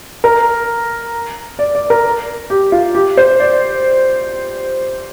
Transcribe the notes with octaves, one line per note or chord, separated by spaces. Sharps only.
A#4
D5
D5
A#4
G4
F4
G4
C5
D5